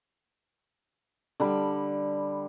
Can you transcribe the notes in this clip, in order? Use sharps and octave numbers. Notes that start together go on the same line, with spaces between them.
D3 G3 B5